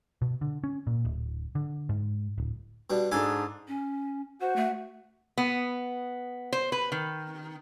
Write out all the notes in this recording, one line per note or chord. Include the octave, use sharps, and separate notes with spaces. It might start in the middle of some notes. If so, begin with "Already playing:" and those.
B2
D3
C#4
A#2
D1
D3
G#2
D1
B2 G3 D4
G#2 D4 G#4 A4 G#5 D6
C#4
F#4 C5
A3
B3
C5
B4
D#3